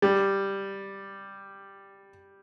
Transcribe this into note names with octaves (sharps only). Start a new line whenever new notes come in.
G3